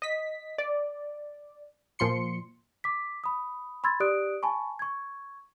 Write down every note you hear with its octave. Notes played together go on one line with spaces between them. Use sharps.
D#5 B6
D5
A#2 F3 C6 C#7
D6 B6
B5 D#6
B5 C6 E6 G#6 A6
G4 D5 D#6 F#6 D7
G#5 A5 B5 C#6
C#6 G#6